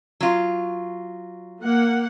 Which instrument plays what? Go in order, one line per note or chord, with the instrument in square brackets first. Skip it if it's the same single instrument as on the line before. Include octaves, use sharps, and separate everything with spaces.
[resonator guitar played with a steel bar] F#3 F4
[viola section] A#3 F#5